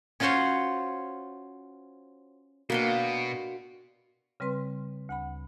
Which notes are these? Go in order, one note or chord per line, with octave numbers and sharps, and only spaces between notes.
C#4 F4 F#4 C5 C#5 F#5
B2 A#3 D4 F#4 G5
C#3 G3 C4 B4 C6
D2 F#5 B5